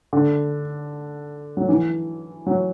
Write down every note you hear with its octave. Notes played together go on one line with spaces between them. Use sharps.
D3
F#3
E3
F#3